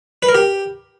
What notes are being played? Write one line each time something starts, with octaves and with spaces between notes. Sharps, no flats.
B4
A#4
G4